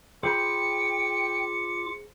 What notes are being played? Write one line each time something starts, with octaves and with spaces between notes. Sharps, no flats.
F4 G#4 C5 G5 B5 D6 C#7